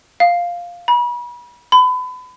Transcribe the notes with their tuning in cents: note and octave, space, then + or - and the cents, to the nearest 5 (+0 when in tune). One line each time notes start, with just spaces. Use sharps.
F5 +0
B5 -35
B5 +30